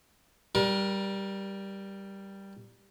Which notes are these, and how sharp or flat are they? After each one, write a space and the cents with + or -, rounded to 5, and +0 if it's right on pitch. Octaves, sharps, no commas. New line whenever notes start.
G3 +0 A#4 +30